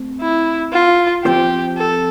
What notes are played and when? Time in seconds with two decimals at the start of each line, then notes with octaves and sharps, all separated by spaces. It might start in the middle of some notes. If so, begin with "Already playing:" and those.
Already playing: A3 C4
0.21 E4
0.72 F4
1.25 F3 C4 F4 G4 C5
1.78 A4